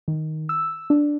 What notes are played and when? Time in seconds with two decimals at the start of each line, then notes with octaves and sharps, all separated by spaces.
0.08 D#3
0.49 E6
0.90 D4